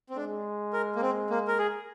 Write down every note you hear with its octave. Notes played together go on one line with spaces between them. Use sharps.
C4
G#3 D4
A#4
A#3
C4
A#3
A#4
G#4